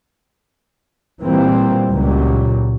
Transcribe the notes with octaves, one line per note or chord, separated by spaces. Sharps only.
A#2 E3 G3 A#3 C4
C#2 A#2 F#3 G3